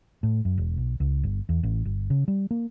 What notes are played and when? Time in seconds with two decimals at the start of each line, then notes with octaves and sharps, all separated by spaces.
0.23 A2
0.45 F#2
0.58 E1
0.77 B1
1.00 C#2
1.23 G1
1.49 E2
1.63 A1
1.85 G1
2.10 C#3
2.28 G3
2.51 A#3